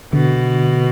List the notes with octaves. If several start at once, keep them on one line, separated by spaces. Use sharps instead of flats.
B2 D3